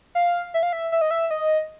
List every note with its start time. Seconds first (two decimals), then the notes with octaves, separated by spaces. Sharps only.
0.15 F5
0.54 E5
0.63 F5
0.73 E5
0.92 E5
1.01 D#5
1.11 E5
1.31 D#5